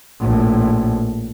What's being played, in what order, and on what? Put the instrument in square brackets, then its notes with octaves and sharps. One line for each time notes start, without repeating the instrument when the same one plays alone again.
[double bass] A#1 A2